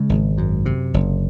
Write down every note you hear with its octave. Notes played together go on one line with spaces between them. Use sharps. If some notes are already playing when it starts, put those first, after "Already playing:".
Already playing: C#3 G#3
G#1
F#2
C3
F#1